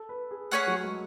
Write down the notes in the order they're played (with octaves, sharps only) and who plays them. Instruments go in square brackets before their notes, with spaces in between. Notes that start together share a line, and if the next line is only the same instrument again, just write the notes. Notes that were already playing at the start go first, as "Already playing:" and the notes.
Already playing: [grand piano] A4
B4
G#4
[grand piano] A3 [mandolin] C#4 G#4 C#5 F#5
[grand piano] F#3
G#3